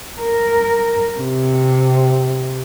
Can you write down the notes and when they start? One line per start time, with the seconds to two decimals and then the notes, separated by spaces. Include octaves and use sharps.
0.20 A#4
1.17 C3